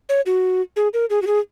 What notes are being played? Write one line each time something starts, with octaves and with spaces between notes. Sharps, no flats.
C#5
F#4
G#4
A#4
G#4
F#4
G#4